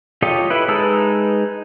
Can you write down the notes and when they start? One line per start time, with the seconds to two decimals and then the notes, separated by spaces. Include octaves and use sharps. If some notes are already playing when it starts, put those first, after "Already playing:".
0.22 F4 G4 A4 C#5 D#5
0.50 E4 B4
0.68 G#3 D#4 B4 A5 E6